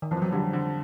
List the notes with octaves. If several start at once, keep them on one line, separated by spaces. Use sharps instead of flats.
D#3
F2 E3
F3
F#3
D3 G3
D3